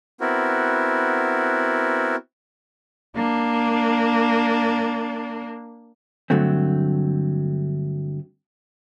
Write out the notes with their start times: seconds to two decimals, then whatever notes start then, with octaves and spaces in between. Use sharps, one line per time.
0.21 B3 C4 E4 F#4 A#4
3.16 A#3 D4
6.30 G2 D3 F#3 A3 C4